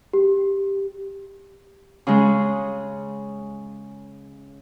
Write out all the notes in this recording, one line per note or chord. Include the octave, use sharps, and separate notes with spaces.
G4
C#3 G#3